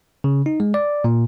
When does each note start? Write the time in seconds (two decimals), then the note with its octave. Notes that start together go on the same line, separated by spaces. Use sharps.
0.24 C#3
0.46 D#4
0.60 G#3
0.74 D5
1.04 A#2